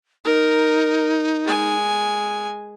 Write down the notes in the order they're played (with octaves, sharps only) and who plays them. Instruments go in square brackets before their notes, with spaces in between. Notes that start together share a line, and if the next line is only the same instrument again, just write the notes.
[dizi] D#4 [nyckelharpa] A#4
[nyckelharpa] G#3 G#5